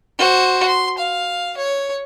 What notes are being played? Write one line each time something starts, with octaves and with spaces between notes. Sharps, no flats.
F#4 C5
C6
F5
C#5